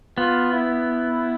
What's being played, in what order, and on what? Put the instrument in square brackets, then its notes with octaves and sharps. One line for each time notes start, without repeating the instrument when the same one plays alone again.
[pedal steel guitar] B3 [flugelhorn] F4
[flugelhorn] E4